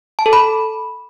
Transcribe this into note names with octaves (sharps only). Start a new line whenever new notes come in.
A5
A4
B5